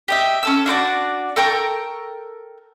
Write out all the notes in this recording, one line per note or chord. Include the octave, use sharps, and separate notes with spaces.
G4 D#5 E5
C#4 A4 E6
D4 F#4 C5 D5
A4 A#4 G5 C#6